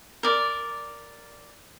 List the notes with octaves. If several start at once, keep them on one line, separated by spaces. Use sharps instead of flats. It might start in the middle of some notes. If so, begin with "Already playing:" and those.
A#4 D5